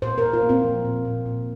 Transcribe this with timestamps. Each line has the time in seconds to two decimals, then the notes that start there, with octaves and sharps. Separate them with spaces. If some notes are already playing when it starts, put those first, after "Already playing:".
0.02 A#2 C5
0.18 A#4
0.23 A#2
0.33 F4
0.43 A#3
0.49 C4
0.64 F3
0.85 A#2
1.05 A#2
1.26 A#2